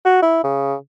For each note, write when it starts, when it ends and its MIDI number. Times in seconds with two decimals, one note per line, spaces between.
0.05 0.17 66
0.22 0.40 64
0.44 0.74 49